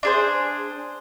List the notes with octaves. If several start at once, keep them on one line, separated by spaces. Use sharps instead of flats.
D4 G#4 C5